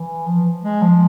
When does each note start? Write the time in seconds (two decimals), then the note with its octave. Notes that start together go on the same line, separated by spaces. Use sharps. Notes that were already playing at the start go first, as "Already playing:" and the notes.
Already playing: E3
0.27 F3
0.63 G#3
0.82 F3